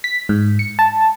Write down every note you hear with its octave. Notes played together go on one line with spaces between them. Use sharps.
B6
G#2
C#7
A5